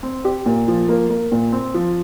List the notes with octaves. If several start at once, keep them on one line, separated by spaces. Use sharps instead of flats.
C4
G4
A#2
F3
A#3
A#3
A#2
C4
F3